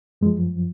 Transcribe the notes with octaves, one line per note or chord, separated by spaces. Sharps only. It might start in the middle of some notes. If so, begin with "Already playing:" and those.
F#2 F3 G#3